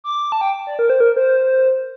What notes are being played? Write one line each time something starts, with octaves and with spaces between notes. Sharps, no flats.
D6
A5
G5
D5
A#4
C5
A#4
C5